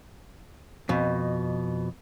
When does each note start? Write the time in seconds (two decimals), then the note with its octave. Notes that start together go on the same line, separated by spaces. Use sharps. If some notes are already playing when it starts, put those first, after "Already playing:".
0.89 F2 B2